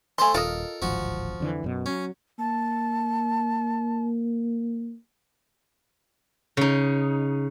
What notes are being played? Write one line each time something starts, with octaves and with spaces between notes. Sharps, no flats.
A3 C5 G#5 A5 C6
D#1 F4 A4 A#4 D#5
D1 G#1 F3 F#4
F2 D3 E3
F#2 B2
F#3 C#4
A#3 A5
C#3 D#4